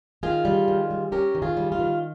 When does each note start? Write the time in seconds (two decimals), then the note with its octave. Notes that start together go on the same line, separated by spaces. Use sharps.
0.23 D#3 F4 G#4
0.45 G3
0.68 D#3
0.91 G3
1.12 C#4 G4 A#4
1.35 D#3
1.42 F4 G#4
1.57 G3
1.72 F4
1.79 D#3